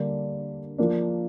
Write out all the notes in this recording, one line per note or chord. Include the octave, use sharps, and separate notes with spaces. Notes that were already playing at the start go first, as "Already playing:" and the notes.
Already playing: D3 G3 A#3 D4
F3 A#3 D4